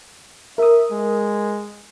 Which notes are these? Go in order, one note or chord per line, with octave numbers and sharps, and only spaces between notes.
A#4 E5 D#6
G#3